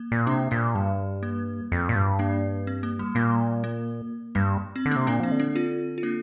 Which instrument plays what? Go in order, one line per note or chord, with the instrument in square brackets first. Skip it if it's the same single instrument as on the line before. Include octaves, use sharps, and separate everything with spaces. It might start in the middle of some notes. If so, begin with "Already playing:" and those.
Already playing: [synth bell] A#3
[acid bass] A#2
[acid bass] C3 [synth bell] A#3 D4
[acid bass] A#2 [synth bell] A#3
[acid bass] G2 [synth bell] G3
[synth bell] A#3
[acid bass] F2
A#2
G2
[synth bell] A#3 D4
C4
A#3
G3
[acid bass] A#2 [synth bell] A#3
[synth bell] A#3
[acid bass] G2 [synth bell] G3
[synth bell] C4
[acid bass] D3
[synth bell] A#3 D4
[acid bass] C3
[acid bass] A#2 [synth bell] A#3 D4
[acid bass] F3 [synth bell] C4
[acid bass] D3
[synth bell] A#3 D4
C4 F4
F4
A#3 D4